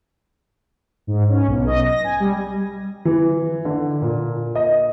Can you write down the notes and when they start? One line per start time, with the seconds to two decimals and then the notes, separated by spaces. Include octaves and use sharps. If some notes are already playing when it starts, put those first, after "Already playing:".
1.07 G#2
1.29 C#4
1.47 B1
1.67 D#5
1.84 A#6
2.04 G#5
2.20 G3
3.05 E3
3.65 D3
4.02 A#2
4.55 D#5